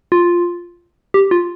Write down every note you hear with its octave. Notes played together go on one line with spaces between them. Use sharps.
F4
G4
F4